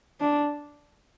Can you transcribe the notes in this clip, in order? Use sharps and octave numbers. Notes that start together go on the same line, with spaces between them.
D4